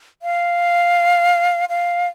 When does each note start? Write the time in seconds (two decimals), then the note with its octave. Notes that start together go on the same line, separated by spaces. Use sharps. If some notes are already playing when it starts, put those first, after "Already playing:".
0.22 F5
1.69 F5